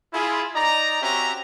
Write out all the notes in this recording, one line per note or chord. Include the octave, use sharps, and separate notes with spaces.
E4 F4 G#4
D#4 D5 D#5 A#5
C4 C#4 F#4 G4 E5 A#5